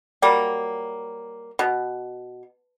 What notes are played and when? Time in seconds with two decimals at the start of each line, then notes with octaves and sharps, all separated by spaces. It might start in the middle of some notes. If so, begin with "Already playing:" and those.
0.22 F#3 G3 A#3
1.59 B2